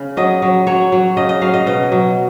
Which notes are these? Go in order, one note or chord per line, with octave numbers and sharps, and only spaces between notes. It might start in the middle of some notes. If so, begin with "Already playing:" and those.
Already playing: C#3
F#3 D#5
F#3
F#3 C#5
F#3
C#3 D#5
D#5
F#3 F5
D#5
B2 D#5
F#3